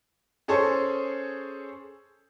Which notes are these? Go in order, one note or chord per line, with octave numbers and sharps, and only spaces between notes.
C#4 G#4 A4 C5 C#5